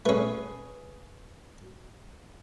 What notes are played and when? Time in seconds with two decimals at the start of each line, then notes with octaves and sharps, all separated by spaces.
0.06 A3 C#4 G#4 B4